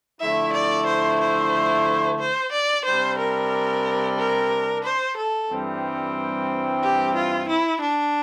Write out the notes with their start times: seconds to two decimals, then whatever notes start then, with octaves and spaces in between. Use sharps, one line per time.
0.21 D3 F3 A3 E4 E5
0.53 D5
0.87 C5
1.21 C5
2.19 C5
2.52 D5
2.85 C3 G3 D4 C5
3.19 A#4
4.18 A#4
4.84 C5
5.17 A4
5.50 G2 E3 G3 C4
6.83 G4
7.16 F4
7.49 E4
7.82 D4